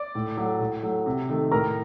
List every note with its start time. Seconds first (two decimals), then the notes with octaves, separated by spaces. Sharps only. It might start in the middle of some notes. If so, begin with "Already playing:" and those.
Already playing: D5 D6
0.15 A2
0.37 F#3 A3
0.60 A2
0.83 F#3 A3
1.06 C3
1.29 D#3 A3
1.52 A2 A#4 A#5